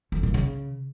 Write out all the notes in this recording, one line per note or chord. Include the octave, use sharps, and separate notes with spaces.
F2
A#2
C#3